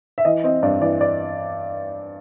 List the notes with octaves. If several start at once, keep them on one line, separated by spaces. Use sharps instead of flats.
E5
E3 D#5
C4 D#5
G2 D5
E3 D5
D5